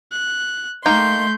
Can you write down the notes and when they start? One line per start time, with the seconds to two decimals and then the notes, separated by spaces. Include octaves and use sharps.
0.12 F#6
0.86 A3 A#3 D#4 G5 C6 G6